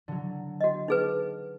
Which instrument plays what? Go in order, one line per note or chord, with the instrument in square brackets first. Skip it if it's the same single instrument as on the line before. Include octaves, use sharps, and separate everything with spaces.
[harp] D3 F#3
[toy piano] F#4 D#5
D#4 G#4 B4